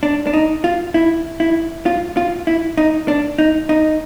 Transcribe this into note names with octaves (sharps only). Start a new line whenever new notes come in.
D4
D4
D#4
F4
E4
E4
F4
F4
E4
D#4
D4
D#4
D#4